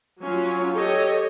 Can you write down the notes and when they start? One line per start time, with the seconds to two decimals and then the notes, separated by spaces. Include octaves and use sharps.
0.22 F#3 C#4 F4
0.72 G4 A4 C#5 D#5